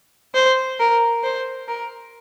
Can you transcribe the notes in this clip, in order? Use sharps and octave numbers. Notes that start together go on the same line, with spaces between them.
C5
A#4
C5
A#4